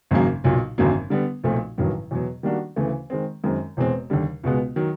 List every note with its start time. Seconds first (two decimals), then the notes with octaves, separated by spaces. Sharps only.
0.11 G#1 F#2 C#3 F#3 A#3
0.44 B1 A#2 F#3
0.78 G#1 F#2 D3 F#3 A#3
1.10 D3 G3 B3
1.44 B1 A#2 F3 A3 C4
1.78 A1 G2 D#3 F#3
2.11 E2 B2 F#3
2.43 D#3 G3 A#3 D4 F#4
2.76 D2 C#3 E3 A3
3.10 D#3 G#3 C4
3.44 F#2 D#3 G#3 C4
3.77 E1 E2 B2 G#3 C4
4.10 D#2 D3 G3
4.44 C#2 B2 G#3 B3
4.76 D#3 F#3